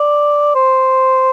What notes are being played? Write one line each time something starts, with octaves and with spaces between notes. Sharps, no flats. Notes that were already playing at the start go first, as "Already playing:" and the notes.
Already playing: D5
C5